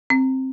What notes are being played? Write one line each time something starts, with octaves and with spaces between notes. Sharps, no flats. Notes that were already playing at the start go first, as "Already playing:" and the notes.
C4